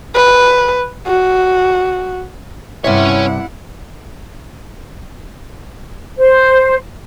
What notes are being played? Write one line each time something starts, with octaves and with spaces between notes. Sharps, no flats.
B4
F#4
G2 C3 C#4 E4 C#5 E5 F#5
C5